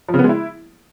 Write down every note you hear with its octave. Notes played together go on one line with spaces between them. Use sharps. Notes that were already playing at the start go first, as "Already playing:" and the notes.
F3
C#3
B3
G#3
E4